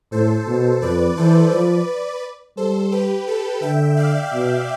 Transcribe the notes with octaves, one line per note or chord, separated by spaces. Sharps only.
A2 A4 C5
B2
F2 B4 D5
E3 A4 C5
F3 B4 D5
G3 A4 C5
G4 B4
A4
D3 E5 G5
D5 F5
B2